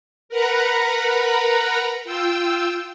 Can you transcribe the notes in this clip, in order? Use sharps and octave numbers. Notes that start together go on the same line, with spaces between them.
A#4 B4 F#5 A#5 B5
F4 G5 E6